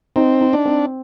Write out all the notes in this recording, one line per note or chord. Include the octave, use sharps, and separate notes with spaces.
C4 D#4
D#4
D4
C4